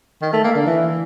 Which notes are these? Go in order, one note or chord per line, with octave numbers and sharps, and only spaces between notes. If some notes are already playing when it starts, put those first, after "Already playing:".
D#3
A3
A#3
D3
E3